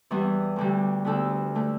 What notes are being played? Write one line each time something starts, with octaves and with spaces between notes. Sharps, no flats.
E2 E3 G3 B3
D2 D3 G3
D2 D3 B3 D4 A4
D3 A3